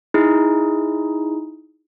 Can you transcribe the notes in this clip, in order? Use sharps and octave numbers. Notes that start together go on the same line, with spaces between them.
D#4 E4 G#4